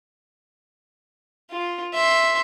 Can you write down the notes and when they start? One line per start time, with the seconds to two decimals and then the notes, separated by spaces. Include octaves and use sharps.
1.51 F4
1.93 E5 C6